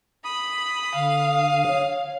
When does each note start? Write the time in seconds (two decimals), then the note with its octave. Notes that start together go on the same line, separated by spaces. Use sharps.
0.25 B5 D#6
0.95 D3 F5
1.67 C#5